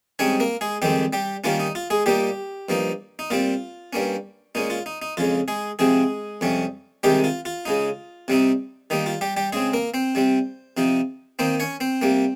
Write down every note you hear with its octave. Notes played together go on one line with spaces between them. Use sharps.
G#2 G3 C4 C#4 D#4 C#5
A#3 A#4
G#3 G#4
F2 D#3 G3 G#3 C4 G4
G3 G4
D#3 G3 A#3 C#4 F4
D#4
F4
G#3 G#4
A#2 G3 A#3 D#4 G4
G2 F3 A#3 D#4
D#4
A#2 G3 C4 F4
G2 G3 A#3 C#4
A#2 G#3 C#4 D#4
F4
D#4
D#4
F2 C#3 G#3 F4
G#3 G#4
C3 F3 G#3 C4 G#4
F2 C3 G3 C#4
C3 D#3 G3 G#3 D#4 G4
F4
F4
C#3 G#3 D#4
C3 G3 C4 D#4
D#3 G3 A#3 D#4
F4
G3 G4
G3 G4
C#3 G#3 C4 G#4
A#3 A#4
C4 C5
C3 G3 C4
C3 F3 C4 D#4
D#3 A#3 C4 D#4 C5
C#4 C#5
C4 C5
C3 G3 A#3